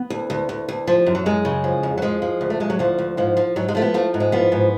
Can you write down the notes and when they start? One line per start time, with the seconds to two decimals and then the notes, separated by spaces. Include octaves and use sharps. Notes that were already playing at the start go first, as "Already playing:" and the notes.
Already playing: B3
0.10 D2
0.30 D2
0.49 D2
0.69 D2
0.87 F3
1.06 F#2
1.15 F#3
1.26 F#2 G#3
1.45 C#3
1.64 F3
1.83 F2
1.98 F#3
2.02 F3 G#3
2.22 F3
2.41 D2
2.50 A3
2.60 D2 G#3
2.70 F#3
2.79 D2 F3
2.99 D2
3.17 G#2 F3
3.37 F3
3.56 G#2 F#3
3.68 G#3
3.75 F3 A3
3.82 B3
3.94 F3 A3
4.14 G#2
4.20 G#3
4.32 F3 B3
4.52 G#2